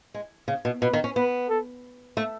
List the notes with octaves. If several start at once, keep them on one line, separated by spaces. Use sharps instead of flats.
G#3
C#3
B2
B2 B4
D#3
C#4
B3 B4
A4
A3